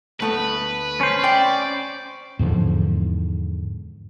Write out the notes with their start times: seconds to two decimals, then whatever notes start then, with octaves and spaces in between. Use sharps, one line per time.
0.20 D2 A3 B3 B4
1.01 C#4 C5
1.24 D5 G5
2.39 E2 G#2 D3 F3